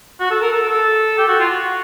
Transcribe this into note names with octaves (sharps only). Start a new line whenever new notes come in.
F#4
A4
A#4
A4
A4
G4
F#4
F4
F#4